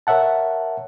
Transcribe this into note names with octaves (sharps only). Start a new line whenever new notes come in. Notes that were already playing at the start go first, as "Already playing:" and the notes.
A#4 C#5 E5 F#5 A5